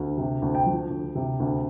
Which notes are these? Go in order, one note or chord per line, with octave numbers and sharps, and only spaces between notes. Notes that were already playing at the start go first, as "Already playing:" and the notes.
Already playing: D2
C3
D2
G5
F3
D2
C3
D2